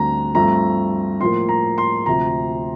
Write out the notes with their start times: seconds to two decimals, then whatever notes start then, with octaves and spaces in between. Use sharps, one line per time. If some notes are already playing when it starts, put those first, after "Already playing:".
Already playing: D2 D3 G3 C4 A#5
0.35 G2 F3 A3 C4 A#5
1.20 A2 F3 A#3 C6
1.49 A#5
1.78 C6
2.06 D2 C3 F3 A#5